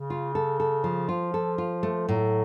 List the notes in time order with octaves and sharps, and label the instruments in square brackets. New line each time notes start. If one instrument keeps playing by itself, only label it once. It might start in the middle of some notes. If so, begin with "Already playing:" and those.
Already playing: [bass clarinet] C#3
[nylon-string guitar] F4
A4
A4
F3
[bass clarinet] F3 [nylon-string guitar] F4
[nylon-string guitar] A4
F4
A3
[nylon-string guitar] A2 [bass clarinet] F#3